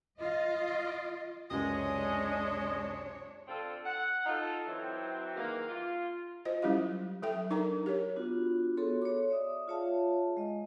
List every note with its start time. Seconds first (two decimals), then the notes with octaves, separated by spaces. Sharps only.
0.20 F4 D#5
1.50 C#2 F#2 C3 G#3 D4 C#5 D#5
3.48 D3 C4 F4 A4
3.86 F#5
4.26 D#4 F4 A4
4.67 E3 F#3 C4
5.35 G#2 D#3 E3 A#3
5.68 F4
6.45 F4 C5 D#5
6.62 F#3 G3 C#4 E4 G4 F5
7.23 F#3 A4 E5 G5
7.50 D4 D#4 A#4 D5 A#5
7.86 G4 A#4 C#5
8.16 B3 D4 F4 F#4
8.77 B3 F#4 G#4 A4 C#5 C6
9.02 C#5 D6
9.30 D5 E5 D#6
9.68 F4 G#4 C#5 E5 F5 A5
10.37 G#3 D#5